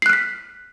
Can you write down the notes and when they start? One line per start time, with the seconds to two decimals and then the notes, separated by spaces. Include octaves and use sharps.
0.02 C7
0.06 F#6
0.09 F6
0.13 B6